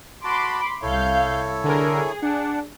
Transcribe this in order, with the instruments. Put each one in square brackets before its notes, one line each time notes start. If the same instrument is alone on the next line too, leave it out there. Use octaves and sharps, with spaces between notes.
[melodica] F#4 A5 [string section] B5 C6 D6
[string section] C2 F5 G6 [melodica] E4 A4 C#5
[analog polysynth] D3 A#4 [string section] G#4
[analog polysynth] D4 [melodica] F#5